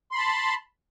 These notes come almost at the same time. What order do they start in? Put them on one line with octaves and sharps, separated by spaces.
C6 B5 A5